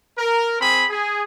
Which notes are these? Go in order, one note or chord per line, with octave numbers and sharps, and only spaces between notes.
A#4
C4 G#4 B5
G#4